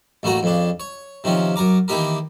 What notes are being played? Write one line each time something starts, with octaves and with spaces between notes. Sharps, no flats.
A1 A3 A#3 F#4 A#5
F2 C#3 D4
C#5
C3 D#3 F3 C#4
F#2 A#4 A#5 D6
D#3 E3 A#3 D#4 G4 A#4